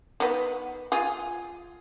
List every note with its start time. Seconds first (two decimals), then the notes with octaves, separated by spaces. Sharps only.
0.20 D#3 B3
0.92 F4 G#4